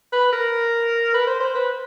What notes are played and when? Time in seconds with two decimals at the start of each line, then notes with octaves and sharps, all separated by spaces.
0.12 B4
0.33 A#4
1.14 B4
1.27 C5
1.40 C5
1.55 B4